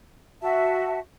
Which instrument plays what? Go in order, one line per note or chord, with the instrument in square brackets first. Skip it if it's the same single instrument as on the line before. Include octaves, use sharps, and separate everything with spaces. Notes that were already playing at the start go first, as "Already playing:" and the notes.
[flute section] F#4 E5 A5